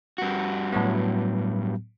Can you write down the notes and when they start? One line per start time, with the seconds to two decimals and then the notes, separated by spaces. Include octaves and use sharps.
0.18 G2 F#4
0.73 A2 F#3 B3